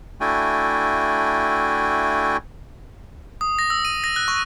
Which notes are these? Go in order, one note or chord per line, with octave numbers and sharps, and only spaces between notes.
A3 D4 E4 F#4 G5 G#5
D#6
A#6
E6
D#7
A#6
F#6
C#6